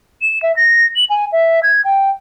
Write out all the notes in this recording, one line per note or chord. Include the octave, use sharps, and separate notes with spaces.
E7
E5
A#6
F#7
G#5
E5
G#6
G5